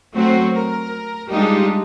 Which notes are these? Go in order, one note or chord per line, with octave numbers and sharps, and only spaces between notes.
F#3 A3 C4 F#4 C5
A#4
G3 G#3 D4 D#4 F4 G4